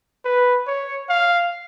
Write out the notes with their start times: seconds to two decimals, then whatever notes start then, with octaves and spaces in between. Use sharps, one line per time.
0.25 B4
0.67 C#5
1.09 F5